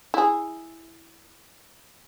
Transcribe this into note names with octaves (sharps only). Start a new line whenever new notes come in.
E4 G#4